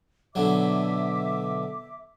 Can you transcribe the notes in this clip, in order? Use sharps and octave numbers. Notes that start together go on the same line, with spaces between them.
B2 D3 F#3 E5 D6